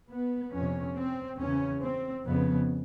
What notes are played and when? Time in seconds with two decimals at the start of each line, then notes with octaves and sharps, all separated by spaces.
0.10 B3
0.53 F2 C3 C#4
0.96 C4
1.39 E2 C#3 C#4
1.82 C4
2.24 F2 C#3 B3